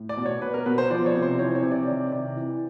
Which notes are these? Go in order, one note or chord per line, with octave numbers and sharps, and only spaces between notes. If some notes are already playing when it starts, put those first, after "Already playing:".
Already playing: A2
D5
B2
C#5
B2 B4
A#4
B2 B4
C5
F3 D5
C#5
C3
C5
E3 C#5
C#5
C3
D5
D#3 D5
C3
E3